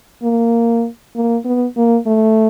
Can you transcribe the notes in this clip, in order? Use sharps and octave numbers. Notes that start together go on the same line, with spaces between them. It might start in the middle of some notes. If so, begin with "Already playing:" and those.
A#3
A#3
B3
A#3
A3